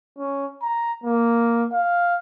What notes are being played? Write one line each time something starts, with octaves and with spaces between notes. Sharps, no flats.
C#4
A#5
A#3
F5